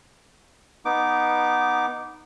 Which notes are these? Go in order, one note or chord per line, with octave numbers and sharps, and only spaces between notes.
B3 D#4 D6